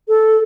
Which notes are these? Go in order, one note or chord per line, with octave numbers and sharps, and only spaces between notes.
A4